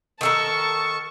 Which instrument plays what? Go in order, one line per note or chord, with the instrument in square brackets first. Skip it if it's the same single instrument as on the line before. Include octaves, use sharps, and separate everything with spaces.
[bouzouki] D#3 A4 A#4 [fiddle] A5 C#6